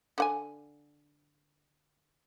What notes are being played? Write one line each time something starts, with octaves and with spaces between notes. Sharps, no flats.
D3 F#5 G#5